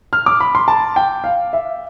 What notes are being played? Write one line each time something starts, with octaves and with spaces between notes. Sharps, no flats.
F6
D6
B5
C6
A5
G5
F5
E5